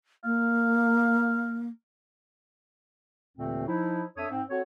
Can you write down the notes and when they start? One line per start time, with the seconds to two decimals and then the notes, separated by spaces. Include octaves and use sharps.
0.24 A#3 F5
3.37 D#2 A#2 D3 E3 A3 C4
3.67 F3 D#4 E4
4.16 F2 D4 A4 C#5 E5 D#6
4.30 G#2 C4
4.49 C4 F#4 A4 C#5